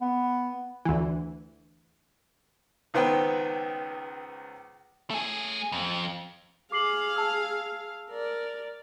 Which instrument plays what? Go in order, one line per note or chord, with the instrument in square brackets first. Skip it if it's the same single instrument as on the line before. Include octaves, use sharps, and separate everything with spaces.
[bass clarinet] B3
[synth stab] D2 E3
[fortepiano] C#2 D#3 B3 C4 B4 G5
[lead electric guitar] A3 G#4
F2
[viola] G#4 F5 [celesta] D6 C7 F#7
[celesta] A5 E6
[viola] A#4 D5